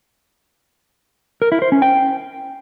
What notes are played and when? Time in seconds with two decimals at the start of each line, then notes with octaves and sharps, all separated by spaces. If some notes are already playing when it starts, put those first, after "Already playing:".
1.42 A#4
1.52 E4
1.62 C5
1.72 C#4
1.82 G5